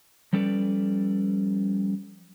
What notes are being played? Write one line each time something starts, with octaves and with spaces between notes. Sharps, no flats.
F3 G3 C#4 A4 B4 D5